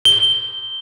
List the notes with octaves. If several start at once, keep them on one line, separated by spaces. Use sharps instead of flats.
G7